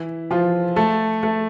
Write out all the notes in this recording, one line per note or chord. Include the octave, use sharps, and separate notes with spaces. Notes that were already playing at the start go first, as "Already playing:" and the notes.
Already playing: E3 E4
F3 F4
A3 A4
A3 A4